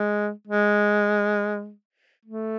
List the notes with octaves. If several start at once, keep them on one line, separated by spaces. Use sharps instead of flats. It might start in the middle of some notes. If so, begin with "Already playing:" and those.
Already playing: G#3
G#3
A3